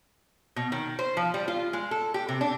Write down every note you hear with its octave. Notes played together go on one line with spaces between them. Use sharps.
B2
D#3
C5
F3
G3
F4
G#3
A4
G4
C3
D4